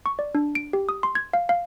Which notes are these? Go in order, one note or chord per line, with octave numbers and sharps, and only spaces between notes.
C#6
D5
D4
D7
G4
D#6
C6
G#6
F5
F5